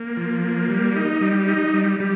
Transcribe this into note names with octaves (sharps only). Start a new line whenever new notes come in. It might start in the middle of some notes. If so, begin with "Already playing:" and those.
Already playing: A#3
F3
A#3
G3
D#4
G3
D#4
G3
G3